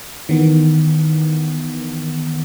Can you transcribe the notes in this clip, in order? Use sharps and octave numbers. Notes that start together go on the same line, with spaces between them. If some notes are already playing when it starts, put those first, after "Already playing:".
D#3 E3 B3